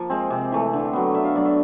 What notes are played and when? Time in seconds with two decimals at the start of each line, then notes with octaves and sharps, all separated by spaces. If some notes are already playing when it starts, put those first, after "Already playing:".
Already playing: F3 A#3
0.10 G#3 C4
0.30 C3
0.52 E3 A3
0.73 D3
0.93 F#3 B3
1.15 D3 E5
1.25 F5
1.35 F#3 B3 D4 D5
1.45 E5